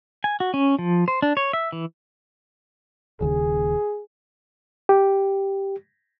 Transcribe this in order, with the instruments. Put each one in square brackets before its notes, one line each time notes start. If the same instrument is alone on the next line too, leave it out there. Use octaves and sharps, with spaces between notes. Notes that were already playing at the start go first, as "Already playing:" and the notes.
[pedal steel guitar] G#5
F#4
C#4
F3
C5
D4
C#5
E5
E3
[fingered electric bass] D#1 D#2 C#3 [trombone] G#4
[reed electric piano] G4